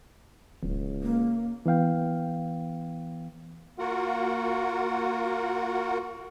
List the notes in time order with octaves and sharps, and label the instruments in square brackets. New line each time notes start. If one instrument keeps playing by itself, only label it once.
[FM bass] D1 [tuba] C#2
[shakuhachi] A#3
[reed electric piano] E3 B3 F5 G5
[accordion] A#3 F4 F#4 A#4 F#5